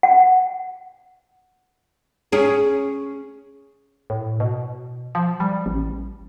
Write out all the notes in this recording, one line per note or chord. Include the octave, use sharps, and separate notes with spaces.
F#5
C#4 G#4
A2
B2
F3
G3
A1